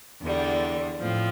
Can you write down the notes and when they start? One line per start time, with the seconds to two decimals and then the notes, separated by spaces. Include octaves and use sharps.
0.21 E2 D3 G3
0.99 A2 F3 C4